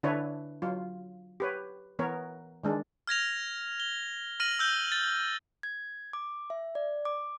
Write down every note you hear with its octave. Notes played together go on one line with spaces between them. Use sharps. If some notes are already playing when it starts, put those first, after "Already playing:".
D3 D4 E4 B4 C#5
F#3 F4
G4 B4 C#5
E3 B3 A#4 C#5
D#3 G#3 D4
F6 G#6 A#6 F7
G7
F6 A#6 D#7 F#7
E6 G6 G7
A6 G7
G#6
D6
E5
D5
D6